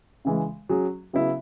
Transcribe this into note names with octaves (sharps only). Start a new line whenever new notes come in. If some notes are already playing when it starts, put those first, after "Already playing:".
C#3 E3 G#3
F#3 C#4 G#4
C#3 F#3 B3 E4